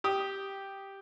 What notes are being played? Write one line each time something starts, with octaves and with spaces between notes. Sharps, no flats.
G4 D#6